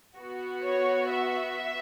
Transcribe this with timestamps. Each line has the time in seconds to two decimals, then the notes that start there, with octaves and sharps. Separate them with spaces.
0.17 B3 F#4
0.63 C#5
1.10 E5